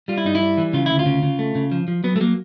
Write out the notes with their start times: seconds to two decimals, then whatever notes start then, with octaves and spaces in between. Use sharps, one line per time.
0.08 G3 F4
0.18 E4
0.24 G2 D#4
0.35 E4
0.41 G3
0.57 E3
0.73 C#3 F4
0.86 D2 E4
0.99 F4
1.06 C#3
1.23 C#3
1.39 A3
1.55 C#3
1.72 F3
1.88 F3
2.04 F#3 B3
2.16 A3
2.20 F#3 A#3